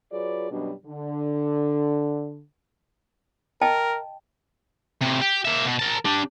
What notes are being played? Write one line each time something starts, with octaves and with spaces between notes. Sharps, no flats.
F#3 F4 G#4 B4 C#5 D5
F#2 B2 F#3 G3 D4
D3
A#4 D#5 G5 A5
A2 C3
G4
A#3 E5
B2
A#4 A5
D4 G4